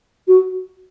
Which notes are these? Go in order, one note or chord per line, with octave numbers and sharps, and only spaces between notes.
F#4